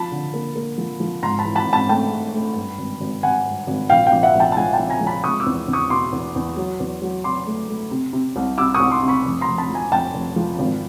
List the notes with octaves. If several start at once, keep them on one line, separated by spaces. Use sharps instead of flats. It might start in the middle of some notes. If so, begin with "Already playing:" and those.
Already playing: F3 A5 B5
D3
A#3
A#3
F3
F3
G#2 A#5 C6
A5 B5
E3
A5 B5
G#2
A5 B5
A3 G5 A5
A3
A3
G2
G#1
G#1
G#1 F#5 G#5
G2
G#1
A#1 F5 G5
F5 G5
A#1
E5 F#5
A#1
G5 A5
A5
F3 F#5 G#5
G5 A5
F3
G#5 A#5
F3
A5 B5
G#3 C#6 D#6
D6 E6
E2
E2
C#6 D#6
B2 C6 D6
E2
E2
F#3
E2
F#3
F#3 C6 D6
A3
A3
C3
C3
C2
C3 D6 E6
C#6 D#6
C2
C6 D6
C3
B5 C#6
F1
A#5 C6
F1
A5 B5
F3
G#5 A#5
F1 G5 A5
F1
F3
G#1